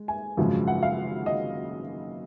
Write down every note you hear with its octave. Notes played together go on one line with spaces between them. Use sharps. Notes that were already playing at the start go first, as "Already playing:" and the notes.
Already playing: G#3
G#5
G#1 F#2 C#3 F3 G#3
F#5
F5
D#5